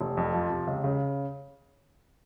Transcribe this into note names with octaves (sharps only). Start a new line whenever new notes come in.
F1
F2
F3
C3
C#2
C#3